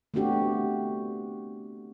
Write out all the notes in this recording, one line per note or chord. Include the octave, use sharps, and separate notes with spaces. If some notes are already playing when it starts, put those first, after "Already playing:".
A3 B3 C4 D4 F#4 G4